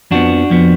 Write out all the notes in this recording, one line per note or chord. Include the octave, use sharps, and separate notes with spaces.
F2 F3 B3 D4 F#4
F2 F3 B3